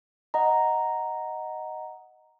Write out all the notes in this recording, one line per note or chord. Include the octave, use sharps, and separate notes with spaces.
D#5 F#5 A#5